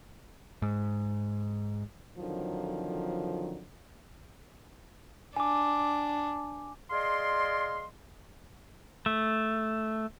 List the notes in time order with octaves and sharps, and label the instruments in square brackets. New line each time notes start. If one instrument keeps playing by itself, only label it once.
[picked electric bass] G#2
[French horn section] F2 D3 D#3 F3 F#3
[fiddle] D4 [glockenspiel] G#5 D6
[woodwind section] G#4 D5 D#5 F5 C6
[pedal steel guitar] A3